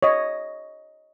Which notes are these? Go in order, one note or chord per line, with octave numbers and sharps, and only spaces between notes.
C#5 D#5